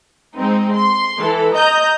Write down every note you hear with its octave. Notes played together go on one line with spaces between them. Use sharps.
G#3 C4 D#4
C6
E3 A4
D#5 A#5 G6